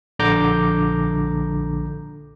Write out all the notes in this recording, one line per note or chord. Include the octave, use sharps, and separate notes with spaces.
A#1 D3 A#5 D6 G6